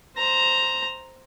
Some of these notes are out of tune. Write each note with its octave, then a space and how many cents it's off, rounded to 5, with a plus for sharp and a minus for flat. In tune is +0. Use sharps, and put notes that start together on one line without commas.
C5 +0 A#5 +0